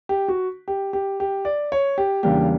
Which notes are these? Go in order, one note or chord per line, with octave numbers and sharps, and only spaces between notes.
G4
F#4
G4
G4
G4
D5
C#5
G4
E2 C#3 G3 A#3 D4 G4